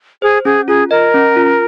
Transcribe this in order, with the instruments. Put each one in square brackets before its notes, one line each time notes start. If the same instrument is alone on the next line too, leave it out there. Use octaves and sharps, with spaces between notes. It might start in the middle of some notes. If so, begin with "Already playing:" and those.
[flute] G#4 [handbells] C5
[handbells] C#4 [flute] G#4
[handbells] F4 [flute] G#4
[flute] A#4 [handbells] D#5
[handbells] C#4
F4